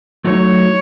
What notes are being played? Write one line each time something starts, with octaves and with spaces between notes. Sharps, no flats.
F#3 A3 D#4 F#4 C#5